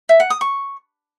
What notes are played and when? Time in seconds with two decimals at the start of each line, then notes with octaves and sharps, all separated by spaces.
0.09 E5
0.20 F#5
0.30 D#6
0.41 C#6